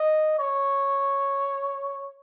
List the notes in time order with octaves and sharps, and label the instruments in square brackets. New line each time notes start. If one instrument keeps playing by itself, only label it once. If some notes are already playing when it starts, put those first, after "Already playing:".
Already playing: [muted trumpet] D#5
C#5